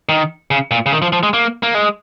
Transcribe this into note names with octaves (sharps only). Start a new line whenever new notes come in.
D#3
C#3
A#2
C#3
D#3
F3
F3
G#3
A#3
A#3
G#3